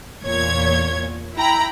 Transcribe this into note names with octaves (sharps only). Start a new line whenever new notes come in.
E2 A#2 C#5 G#6
E4 G5 A#5 B5